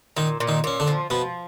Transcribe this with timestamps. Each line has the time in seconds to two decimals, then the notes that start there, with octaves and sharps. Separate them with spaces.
0.16 A#2 D#3 D#4
0.40 A#2
0.48 D#3 D#4
0.64 A#2 C#4
0.80 D3 D4
0.87 F3
1.10 B2 F3 B3